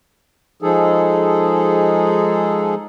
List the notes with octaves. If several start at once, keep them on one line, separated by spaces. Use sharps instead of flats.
F3 G#3 D#4 G#4 A4